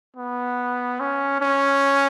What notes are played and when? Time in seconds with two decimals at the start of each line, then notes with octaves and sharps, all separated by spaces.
0.16 B3
1.00 C#4
1.41 C#4